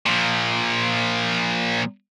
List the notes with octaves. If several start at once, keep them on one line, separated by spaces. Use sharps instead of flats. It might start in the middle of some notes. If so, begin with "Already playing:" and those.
A#2 F3